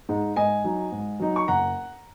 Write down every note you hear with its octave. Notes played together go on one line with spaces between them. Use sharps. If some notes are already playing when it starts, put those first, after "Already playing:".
G#2 G#3 D#4
G#2 D#5 G#5
F#3 D#4
G#2
F#3 D#4
C#6
F#1 F#5 A#5